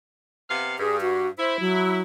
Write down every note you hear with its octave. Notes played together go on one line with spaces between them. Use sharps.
C3 B3 F5
G2 G#4
F#4
E4 C5
F#3